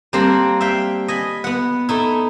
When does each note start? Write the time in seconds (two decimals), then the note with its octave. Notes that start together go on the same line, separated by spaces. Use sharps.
0.13 G3 A#3 C4 D4
0.61 E5 F5 G5
1.08 D#5 G#5 B5
1.44 B3 F#5
1.89 A3 D#4 E4